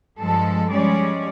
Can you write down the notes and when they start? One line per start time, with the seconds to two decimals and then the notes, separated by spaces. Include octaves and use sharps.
0.18 G2 F3 G#3 A4
0.71 F3 G3 G#3 C#4 D5